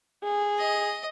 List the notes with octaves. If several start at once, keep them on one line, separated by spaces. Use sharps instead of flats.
G#4
D#5